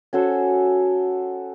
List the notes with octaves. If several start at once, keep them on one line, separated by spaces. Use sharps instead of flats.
C#4 F#4 A4 C5